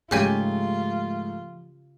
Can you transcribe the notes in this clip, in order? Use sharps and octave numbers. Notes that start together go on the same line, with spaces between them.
G#2 C#3 F3 G#3 A3 F4 G4 G#5